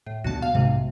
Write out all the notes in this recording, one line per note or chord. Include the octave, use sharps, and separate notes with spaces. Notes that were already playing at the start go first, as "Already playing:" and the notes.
A2
D2 B2 G3 F#4 A5
F5
B1 G#2 C3